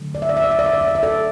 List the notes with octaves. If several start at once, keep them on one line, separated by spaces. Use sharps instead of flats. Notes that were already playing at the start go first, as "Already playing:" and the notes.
Already playing: D3 F#3 A3
D5
E5
D5
E5
D5
E5
D5
E5
D5
E5
D5
E5
A4 D5